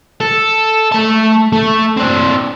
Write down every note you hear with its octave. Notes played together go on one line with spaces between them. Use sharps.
A4
A3 A5
A3
C4 D4